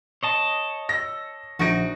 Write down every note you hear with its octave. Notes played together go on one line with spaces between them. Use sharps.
C#5 D#5 A5
E6 A#6
A#1 D#4 F#4 A#6 D7